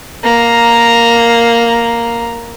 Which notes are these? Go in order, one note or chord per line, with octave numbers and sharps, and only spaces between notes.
A#3 A#5